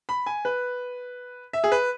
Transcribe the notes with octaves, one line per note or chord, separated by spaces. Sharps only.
B5
G#5
B4
E5
G#4
B4